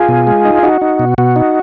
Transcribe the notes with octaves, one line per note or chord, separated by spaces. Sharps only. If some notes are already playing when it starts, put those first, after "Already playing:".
Already playing: F4 G#4
B2
G#3
D#4
D#4 F#4
D#4
B2
B2 F#4
D#4